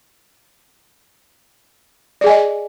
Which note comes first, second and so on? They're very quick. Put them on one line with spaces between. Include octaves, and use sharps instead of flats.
D5 G#4 G#5 D#5